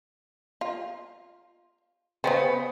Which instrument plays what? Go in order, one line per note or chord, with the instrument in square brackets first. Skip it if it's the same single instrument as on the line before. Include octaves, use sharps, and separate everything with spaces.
[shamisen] F4
[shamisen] C#3 C#4 C5 [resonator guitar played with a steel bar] B3